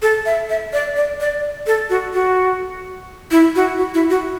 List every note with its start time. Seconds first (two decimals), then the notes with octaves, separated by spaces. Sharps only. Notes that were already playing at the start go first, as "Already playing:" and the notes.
0.02 A4
0.26 E5
0.49 E5
0.73 D5
0.96 D5
1.20 D5
1.67 A4
1.90 F#4
2.14 F#4
3.31 E4
3.56 F#4
3.78 F#4
3.94 E4
4.10 F#4